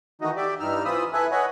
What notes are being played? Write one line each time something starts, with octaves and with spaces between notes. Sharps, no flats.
D#3 E3 A3 D#4 F#4 D#5
G4 D5 E5
G2 E3 G3 D#4 E6 F6
E3 C4 F4 B5 D#6 E6
E4 A4 B4 E5 G#5 F#6
B4 C#5 D#5 F#5 G#5 B5